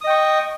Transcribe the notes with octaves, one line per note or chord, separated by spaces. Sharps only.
D#5 G5 C#6 D#6